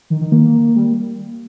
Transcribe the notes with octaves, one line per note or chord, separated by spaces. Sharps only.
D#3
D#3
A#3
G3